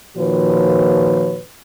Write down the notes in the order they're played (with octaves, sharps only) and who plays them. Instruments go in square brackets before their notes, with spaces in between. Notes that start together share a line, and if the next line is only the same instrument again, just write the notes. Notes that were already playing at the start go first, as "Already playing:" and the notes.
[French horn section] A#2 D#3 F3 F#4 B4 C#5